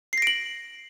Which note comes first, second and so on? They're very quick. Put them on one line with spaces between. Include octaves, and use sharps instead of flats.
C7 A#6 D7 F#7